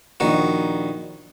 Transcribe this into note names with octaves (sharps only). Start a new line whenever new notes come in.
A#1 D#3 F#4